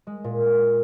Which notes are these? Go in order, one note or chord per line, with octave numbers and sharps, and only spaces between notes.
G#3
A#2